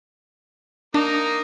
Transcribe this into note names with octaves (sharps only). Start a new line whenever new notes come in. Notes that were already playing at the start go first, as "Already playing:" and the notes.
A#3 D4 D#4